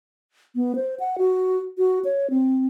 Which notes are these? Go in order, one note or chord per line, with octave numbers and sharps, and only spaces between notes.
B3
C5
F#5
F#4
F#4
C#5
C4